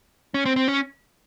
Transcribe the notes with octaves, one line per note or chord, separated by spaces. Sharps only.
C#4
C4
C4
C#4